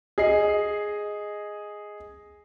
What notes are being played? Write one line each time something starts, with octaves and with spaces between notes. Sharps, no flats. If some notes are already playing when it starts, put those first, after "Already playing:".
G#4 D#5 C7